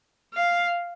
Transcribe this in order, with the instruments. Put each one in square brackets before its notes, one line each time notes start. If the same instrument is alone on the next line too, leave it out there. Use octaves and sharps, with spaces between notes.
[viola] F5